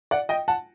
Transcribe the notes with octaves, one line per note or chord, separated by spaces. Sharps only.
D5 F#5
D#5 G5
F#5 A5